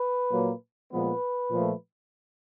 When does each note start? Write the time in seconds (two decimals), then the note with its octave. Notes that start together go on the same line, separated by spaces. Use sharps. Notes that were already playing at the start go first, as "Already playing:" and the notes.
Already playing: B4
0.30 A#2 F#3 A#3
0.91 A#2 F3 G#3 B3 B4
1.51 A#2 F3 A3